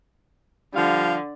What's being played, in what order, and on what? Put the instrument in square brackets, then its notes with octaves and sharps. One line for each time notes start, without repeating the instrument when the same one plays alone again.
[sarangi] D3 [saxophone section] F3 G3 F5